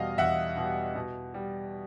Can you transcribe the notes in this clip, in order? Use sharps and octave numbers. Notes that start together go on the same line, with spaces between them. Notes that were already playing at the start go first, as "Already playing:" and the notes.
Already playing: E2 B2 G3 D#5 F5
E2 E5 F#5
B2 G3
B2
G3